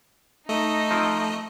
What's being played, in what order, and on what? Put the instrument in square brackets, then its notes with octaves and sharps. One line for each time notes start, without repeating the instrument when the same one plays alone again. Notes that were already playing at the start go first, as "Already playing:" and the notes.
[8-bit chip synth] A3 D#5 [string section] D#4
[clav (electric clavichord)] F3 C4